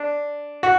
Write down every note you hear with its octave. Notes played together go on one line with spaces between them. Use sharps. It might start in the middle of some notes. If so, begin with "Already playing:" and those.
Already playing: D4
F#4